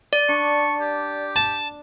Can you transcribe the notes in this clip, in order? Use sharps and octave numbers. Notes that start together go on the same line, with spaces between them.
D5
D4 C#6
G4
A5